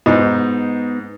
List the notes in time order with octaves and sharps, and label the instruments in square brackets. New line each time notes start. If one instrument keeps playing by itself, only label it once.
[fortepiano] G#2 D#4 [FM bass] B3